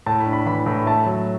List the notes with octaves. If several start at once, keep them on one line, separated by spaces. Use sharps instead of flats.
A2 A5
B5
D4
B5
E3 B5
A2
A3 A5
F#3